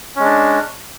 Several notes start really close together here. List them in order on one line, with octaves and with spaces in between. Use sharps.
C#4 G#3 D4